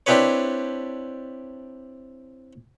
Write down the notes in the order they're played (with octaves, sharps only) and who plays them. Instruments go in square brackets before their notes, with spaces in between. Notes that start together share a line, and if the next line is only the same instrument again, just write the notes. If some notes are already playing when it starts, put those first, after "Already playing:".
[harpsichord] C4 D4 E4 G4 B4 C#5